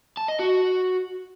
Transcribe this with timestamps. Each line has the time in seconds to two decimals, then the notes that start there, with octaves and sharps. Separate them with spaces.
0.17 A5
0.28 D#5
0.39 F#4